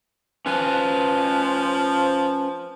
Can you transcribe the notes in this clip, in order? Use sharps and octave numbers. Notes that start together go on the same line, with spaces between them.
F3 C#4 B4 G#5